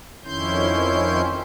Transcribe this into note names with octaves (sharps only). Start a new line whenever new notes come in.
F2 D#3 C#4 E4 C6 G6